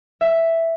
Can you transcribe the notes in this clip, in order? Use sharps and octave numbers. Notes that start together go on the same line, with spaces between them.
E5